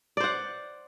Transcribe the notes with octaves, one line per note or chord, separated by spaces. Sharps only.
C5 D5 F#5